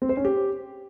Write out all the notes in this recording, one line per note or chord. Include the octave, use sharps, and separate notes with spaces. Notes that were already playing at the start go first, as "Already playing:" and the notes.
C4
C5
C#4
G4